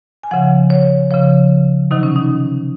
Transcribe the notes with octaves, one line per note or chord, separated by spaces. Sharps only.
G#5
C#3 F3 F#5
C#5
C#3 F3 C#5
C3 D#3 F#3 D#4
C#4
D#4